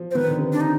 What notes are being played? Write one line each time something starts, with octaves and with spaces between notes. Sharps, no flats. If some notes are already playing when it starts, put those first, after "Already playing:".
Already playing: F3
C5
D#3 B4
D3
C3
D4
D#4